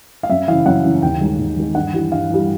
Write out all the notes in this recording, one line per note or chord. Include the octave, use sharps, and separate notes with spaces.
F5
F#2 E5
C#3 E3 F5
F#2 F#5
C#3 E3
D#2 G5
D#3 G#3
D#2
D#3 G#3
G2 F#5
E3 G3
G2 F5
E3 G3